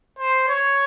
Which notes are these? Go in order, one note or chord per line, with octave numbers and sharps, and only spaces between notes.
C5
C#5